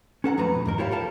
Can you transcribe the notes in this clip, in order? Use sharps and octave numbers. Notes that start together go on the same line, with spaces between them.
C#4 A4 F#5 A#5
F2 F3 F#3 A3 B4 A#5
B1 B2
E2 G#2 A#4
E4 F4 G4 C#5 D5 F5
A4 A#4 F5 A5